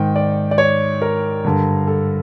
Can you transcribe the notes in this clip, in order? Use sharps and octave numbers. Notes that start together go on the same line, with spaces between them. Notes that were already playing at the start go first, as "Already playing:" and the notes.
Already playing: G#2 D#3 G5
D5
D5
C#5
A#4
G2 D3
A4